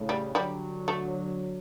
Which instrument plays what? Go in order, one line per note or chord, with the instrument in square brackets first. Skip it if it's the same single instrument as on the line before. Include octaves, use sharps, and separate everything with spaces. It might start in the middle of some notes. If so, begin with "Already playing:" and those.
Already playing: [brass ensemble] A2 C#3
[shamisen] G3
[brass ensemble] D3 F#3 [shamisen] G3
[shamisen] A3